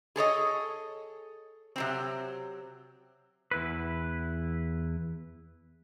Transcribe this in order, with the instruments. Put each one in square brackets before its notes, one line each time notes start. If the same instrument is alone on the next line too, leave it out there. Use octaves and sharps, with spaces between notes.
[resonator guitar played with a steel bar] G#4 A4 C#5 D#5
C3 F#3 C4
[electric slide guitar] E2 E4 B4